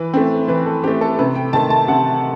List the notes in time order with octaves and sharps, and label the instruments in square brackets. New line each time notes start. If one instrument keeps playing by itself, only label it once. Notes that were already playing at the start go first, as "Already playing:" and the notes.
Already playing: [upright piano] E3 B4
A3 C4
E3 B4
A4
C4 G4
A3
A4
C3 B4
G5
D#3 A3 A5
A5
C3 F#5